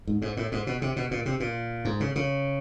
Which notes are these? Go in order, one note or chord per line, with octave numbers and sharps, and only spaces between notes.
G#2
G#2
A2
G#2
B2
C3
B2
A#2
C3
A#2
G#2
C#3
C#3